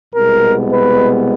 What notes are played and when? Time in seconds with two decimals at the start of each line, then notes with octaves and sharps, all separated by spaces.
0.14 C2 B2 G#3 B3 A#4
0.71 B4